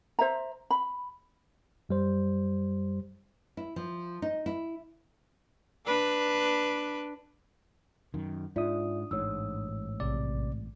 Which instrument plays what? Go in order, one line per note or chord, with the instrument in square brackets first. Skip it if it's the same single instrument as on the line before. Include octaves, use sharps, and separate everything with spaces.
[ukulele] C5 E5 A#5
B5
[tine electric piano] F#2 G3 C5
[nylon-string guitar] E4
F3
D#4
E4
[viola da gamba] D4 B4
[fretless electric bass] F#2 D#3
[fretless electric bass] G#2 [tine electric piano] D4 D#6 [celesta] F4 D5 E5
[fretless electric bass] A1 G#2 [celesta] C#5 E6
[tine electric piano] A#1 C3 D5